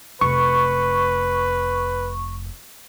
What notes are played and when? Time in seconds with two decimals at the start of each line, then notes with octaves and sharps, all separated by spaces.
0.21 F1 B4 C#6